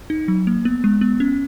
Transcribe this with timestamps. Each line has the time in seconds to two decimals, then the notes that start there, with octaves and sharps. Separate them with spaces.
0.10 D#4
0.28 F#3
0.47 A#3
0.65 B3
0.84 G#3
1.01 B3
1.20 C#4